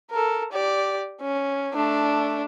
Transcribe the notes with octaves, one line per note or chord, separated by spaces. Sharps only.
A4 A#4
G4 D5
C#4
A3 D4